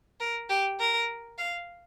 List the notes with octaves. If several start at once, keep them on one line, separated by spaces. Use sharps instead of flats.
A#4
G4
A#4
F5